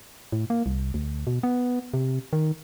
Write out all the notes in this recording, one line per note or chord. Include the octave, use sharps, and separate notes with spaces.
A2
A#3
C2
D2
B2
B3
C3
D#3